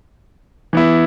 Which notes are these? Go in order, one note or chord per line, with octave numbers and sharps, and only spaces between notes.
E3 B3 E4